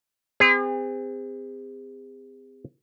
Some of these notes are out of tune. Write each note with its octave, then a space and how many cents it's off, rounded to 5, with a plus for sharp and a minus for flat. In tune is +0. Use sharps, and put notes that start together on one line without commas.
C4 -30 G#4 -40